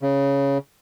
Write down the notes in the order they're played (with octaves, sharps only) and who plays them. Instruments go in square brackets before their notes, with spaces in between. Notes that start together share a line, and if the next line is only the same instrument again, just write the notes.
[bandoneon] C#3